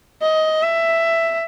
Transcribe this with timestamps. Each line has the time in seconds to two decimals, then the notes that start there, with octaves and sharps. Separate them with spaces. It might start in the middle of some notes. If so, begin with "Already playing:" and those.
0.22 D#5
0.63 E5